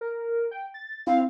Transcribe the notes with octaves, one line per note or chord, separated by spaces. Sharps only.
A#4
G5
A6
C4 E4 F5